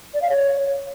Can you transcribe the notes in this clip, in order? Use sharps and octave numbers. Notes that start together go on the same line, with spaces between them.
D5
F5
C#5